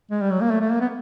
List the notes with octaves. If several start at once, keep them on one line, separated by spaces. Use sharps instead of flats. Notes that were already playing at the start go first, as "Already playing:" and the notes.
G#3
G3
F#3
A#3
A3
A3
A#3
B3